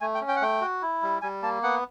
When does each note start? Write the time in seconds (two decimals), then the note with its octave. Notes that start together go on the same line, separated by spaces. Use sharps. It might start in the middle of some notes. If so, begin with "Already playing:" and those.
0.01 A3 G#5
0.15 G5
0.21 C#4
0.28 G5
0.36 F#5
0.41 A3 G5
0.61 F#4
0.82 E4
1.03 G3
1.22 G3 G#5
1.42 A#3 A5
1.63 B3 F#5